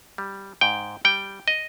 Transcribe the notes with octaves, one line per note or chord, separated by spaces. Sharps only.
G3
G#2 G5
G3 G5
D#5